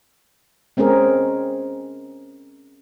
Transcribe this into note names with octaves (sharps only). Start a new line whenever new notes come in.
G#3 C4 C#4 G#4 A#4